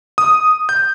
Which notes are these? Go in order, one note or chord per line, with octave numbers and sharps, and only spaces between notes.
D#6
G6